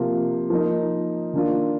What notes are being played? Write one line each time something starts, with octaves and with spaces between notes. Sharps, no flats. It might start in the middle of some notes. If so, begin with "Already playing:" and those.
Already playing: C3 F3 A#3 F4
F3 A#3 D#4
D#3 A#3 D4 F4